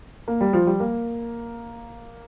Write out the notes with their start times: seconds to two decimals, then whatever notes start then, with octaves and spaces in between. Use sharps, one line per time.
0.28 A#3
0.41 G3
0.53 F3
0.67 G3
0.80 A#3